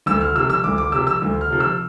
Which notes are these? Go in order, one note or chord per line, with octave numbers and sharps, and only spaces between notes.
D2 E6
F6
C3 F3 E6
E6
D2 D6
D6
C3 F3 E6
E6
D2
F6
C3 F3
E6